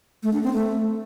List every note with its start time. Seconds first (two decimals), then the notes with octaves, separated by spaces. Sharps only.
0.23 A3
0.33 D4
0.43 C4
0.53 A3